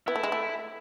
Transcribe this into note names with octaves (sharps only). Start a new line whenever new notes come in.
B3 E4
A3
G#3
A3